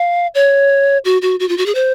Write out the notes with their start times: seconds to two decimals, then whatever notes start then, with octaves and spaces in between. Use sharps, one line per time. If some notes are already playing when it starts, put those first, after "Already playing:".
Already playing: F5
0.35 C#5
1.05 F#4
1.22 F#4
1.40 F#4
1.49 F4
1.58 F#4
1.66 G#4
1.75 C5